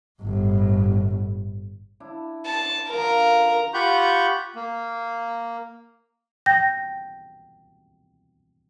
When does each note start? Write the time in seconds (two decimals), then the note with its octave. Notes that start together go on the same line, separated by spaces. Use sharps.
0.21 G1 A2
2.00 D4 E4
2.46 A5
2.90 D3 F3 F4 A#4
3.74 F4 G4 F#5 B5 C#6 G6
4.56 A#3
6.46 G5 G6 A#6